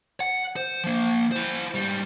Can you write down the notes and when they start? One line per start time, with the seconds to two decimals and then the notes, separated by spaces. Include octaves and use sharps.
0.20 F#5
0.56 C5
0.84 F3 A#3
1.32 E4 C5
1.74 G#2 G3